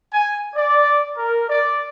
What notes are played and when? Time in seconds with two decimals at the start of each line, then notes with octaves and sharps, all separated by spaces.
0.12 G#5
0.55 D5
1.17 A#4
1.49 D5